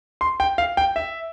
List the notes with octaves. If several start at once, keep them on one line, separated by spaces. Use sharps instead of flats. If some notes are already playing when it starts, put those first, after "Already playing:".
C6
G5
F5
G5
E5